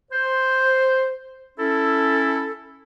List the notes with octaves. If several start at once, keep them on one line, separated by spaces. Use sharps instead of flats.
C5
C#4 E4 A4